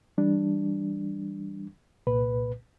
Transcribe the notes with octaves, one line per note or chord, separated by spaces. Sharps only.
E3 G3 D4
C2 A#2 B4